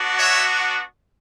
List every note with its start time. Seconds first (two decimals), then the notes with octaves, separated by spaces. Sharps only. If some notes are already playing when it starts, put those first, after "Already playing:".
Already playing: B3 D4 F#4
0.18 C#5 E5